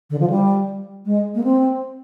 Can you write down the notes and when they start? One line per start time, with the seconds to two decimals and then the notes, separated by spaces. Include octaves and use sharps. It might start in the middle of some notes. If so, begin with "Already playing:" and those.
0.10 D3
0.20 F3
0.29 G3
1.05 G#3
1.35 A#3
1.43 C4